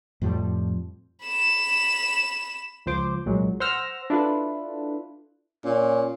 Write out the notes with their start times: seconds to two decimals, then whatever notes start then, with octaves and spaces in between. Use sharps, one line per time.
0.22 F2 A2 F3 G3
1.26 B5 E7
2.86 C#2 F3 C5 D6
3.25 C2 A#2 F#3 G#3
3.60 C5 F#5 E6 F6 A#6
4.10 D4 E4 F4 A4 B4
5.65 A#2 C#4